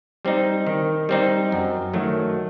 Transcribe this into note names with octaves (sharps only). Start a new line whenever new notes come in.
G3 C4 D#4
D#3
G3 C4 D#4
F#2
D#3 F#3 A3